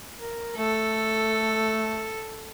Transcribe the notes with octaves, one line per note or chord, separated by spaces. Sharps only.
A#4
A3 A4